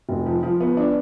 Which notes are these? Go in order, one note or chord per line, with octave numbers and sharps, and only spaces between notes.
F1
F3
F3
B3
D4